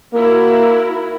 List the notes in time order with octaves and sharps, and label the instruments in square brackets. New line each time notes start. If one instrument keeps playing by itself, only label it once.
[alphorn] A#3 [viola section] E4 F#4 A#4